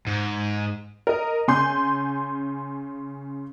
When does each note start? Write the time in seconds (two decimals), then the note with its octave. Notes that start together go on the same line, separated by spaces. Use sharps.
0.07 G#2
1.07 A#4 D#5
1.48 C#3 G#5 C6 G6